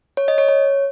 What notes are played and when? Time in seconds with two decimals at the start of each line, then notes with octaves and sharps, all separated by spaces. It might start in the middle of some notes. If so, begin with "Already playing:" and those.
0.17 C#5
0.28 D#5
0.38 C#5
0.49 C#5